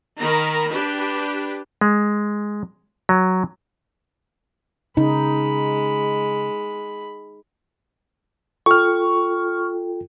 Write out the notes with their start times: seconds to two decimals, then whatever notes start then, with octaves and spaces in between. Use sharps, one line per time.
0.19 D#3 A#4 A#5 B5
0.70 D4 G4 B4
1.81 G#3
3.09 F#3
4.97 C#3 G#3 D#4 B5
8.66 F4 A4 G5 C#6 F6